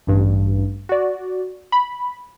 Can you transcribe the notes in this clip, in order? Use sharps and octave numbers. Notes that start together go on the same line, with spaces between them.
A1 G2
F#4 D5
B5